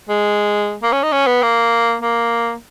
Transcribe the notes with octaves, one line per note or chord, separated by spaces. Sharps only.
G#3
A#3
C#4
D#4
C#4
B3
A#3
A#3